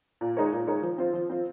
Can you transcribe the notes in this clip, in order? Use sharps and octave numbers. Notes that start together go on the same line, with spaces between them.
A#2
G#3 D#4 A#4 C#5
A#2
G#3 D#4 A#4 C#5
F3
C4 F4 C5
F3
C4 F4 C5